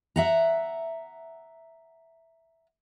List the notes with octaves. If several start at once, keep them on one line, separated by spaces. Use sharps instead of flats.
E5 F#5 A#5